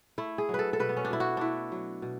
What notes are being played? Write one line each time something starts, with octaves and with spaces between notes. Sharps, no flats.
A3 E4
G#4
F#3
A4 B4
A4
B2 B4
B3
C#4
D4
B2 E4
F#4
A3 D4 E4
F#3
B2